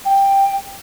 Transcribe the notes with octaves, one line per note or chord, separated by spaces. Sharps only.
G5